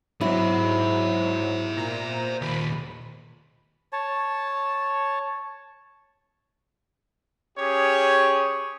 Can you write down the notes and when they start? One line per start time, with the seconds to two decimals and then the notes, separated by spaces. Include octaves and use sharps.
0.21 G#2 F#3 E4 C5 E5
1.76 A#2 A#5
2.42 D#2 A#2 B5
3.93 C#5 A5
7.58 C#4 G4 G#4 C#5